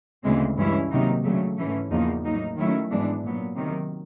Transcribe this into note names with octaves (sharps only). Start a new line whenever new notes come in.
D2 C#3 E3 G#3 C4
G2 E3 G#3 C#4 E4
C3 D#3 F#3 A#3 D#4
D2 C#3 F#3 A3
G#2 E3 A3 C#4
E2 C#3 F3 A#3 D#4
A2 F#3 A#3 D#4
D#3 F#3 A3 C#4 E4
G#2 E3 G#3 B3 D4
A#2 F#3 B3
C3 D#3 F#3